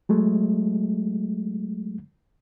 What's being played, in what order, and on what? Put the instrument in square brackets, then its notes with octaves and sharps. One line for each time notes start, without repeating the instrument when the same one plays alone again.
[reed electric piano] F#3 G#3 A3